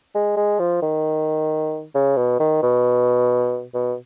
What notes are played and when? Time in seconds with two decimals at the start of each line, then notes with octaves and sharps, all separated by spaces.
0.15 G#3
0.37 G#3
0.59 F3
0.82 D#3
1.95 C#3
2.17 B2
2.40 D#3
2.62 B2
3.74 B2